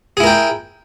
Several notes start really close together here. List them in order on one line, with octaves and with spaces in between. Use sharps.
G#4 E4 A#4 G5